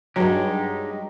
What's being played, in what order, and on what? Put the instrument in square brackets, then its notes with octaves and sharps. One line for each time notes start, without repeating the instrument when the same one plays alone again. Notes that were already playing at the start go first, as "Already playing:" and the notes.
[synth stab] G2 F#3 [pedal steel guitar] G#3 D#4 G4